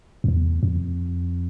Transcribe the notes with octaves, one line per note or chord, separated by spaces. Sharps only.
F2
E2
F2